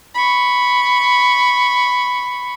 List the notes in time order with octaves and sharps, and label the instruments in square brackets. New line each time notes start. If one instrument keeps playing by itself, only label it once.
[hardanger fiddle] B5 C#6